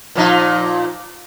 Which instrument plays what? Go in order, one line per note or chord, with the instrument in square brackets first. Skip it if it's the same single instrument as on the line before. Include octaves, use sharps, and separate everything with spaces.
[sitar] A#2 F3 D#4